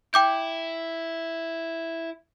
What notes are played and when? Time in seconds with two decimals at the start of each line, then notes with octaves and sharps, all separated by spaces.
0.14 E4 G5 D6 G6